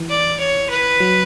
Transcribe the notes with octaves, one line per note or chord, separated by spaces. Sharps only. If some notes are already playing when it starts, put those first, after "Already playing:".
Already playing: E3
D5
C#5
B4
F#3